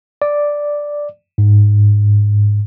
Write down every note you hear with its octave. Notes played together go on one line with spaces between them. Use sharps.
D5
G#2